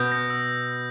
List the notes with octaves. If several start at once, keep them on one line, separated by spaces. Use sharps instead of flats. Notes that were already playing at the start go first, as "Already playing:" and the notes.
Already playing: B2 G6
A#6
E6